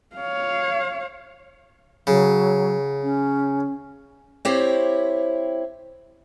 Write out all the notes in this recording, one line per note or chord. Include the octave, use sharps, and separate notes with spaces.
C#5 F5
C#3 F#3
C#4
C4 E4 G4 C5 C#5